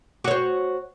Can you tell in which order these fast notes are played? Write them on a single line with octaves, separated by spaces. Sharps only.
F#4 C#5 C5